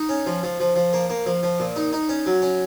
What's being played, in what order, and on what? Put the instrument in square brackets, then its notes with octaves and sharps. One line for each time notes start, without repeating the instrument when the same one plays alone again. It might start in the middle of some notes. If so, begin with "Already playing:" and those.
Already playing: [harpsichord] D#4
C#4
F3
F3
F3
F3
A#3
A#3
F3
F3
A#2
D#4
D#4
C#4
F#3
C#4